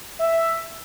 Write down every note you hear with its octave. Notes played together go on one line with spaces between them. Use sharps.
E5